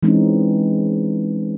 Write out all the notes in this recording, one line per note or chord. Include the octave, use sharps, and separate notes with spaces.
E3 G#3 C4 C#4 D#4